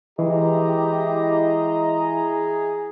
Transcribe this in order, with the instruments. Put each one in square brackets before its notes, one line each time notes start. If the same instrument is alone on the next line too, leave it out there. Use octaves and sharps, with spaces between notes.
[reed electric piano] E3 [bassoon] G#3 [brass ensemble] E4 D#5 A#5 [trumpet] G4
[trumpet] G#4